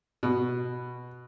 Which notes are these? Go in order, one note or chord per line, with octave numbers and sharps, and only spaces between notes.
B2